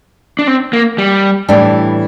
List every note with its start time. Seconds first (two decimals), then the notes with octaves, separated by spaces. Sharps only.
0.39 D4
0.47 C4
0.73 A#3
0.98 G3
1.49 A2 E3 G3 D4